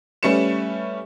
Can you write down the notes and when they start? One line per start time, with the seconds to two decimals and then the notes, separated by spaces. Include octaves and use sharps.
0.23 G3 A3 C#4 B4 C#7 E7